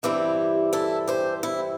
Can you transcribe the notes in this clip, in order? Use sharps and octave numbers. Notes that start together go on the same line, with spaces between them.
G2 E3 G3 C4 E4 G4
E4 A4
G4 C5
E4